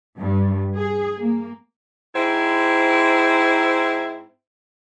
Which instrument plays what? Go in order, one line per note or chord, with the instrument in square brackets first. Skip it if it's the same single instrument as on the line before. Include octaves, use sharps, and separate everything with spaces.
[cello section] G2
G#4
A#3
[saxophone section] G#2 C4 E4